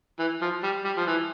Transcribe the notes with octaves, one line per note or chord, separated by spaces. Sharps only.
E3
F3
G3
G3
F3
E3